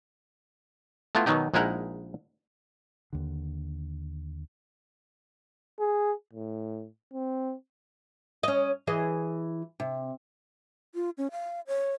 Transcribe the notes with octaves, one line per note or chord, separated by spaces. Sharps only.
A3 B3 E4 F4
B2 D#3 F#3 D#4 G4
A#1 G#3 D#4 E4 A#4 F#5
D#2 D3
G#4
A2
C4
C#4 D#5
E3 G#4 D#5
C3
F4
C#4
F5
C#5